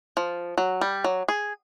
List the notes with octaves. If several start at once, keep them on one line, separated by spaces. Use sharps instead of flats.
F3
F#3
G3
F#3
G#4